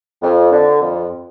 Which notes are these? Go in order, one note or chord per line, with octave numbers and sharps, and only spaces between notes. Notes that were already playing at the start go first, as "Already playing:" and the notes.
F2
D3
F2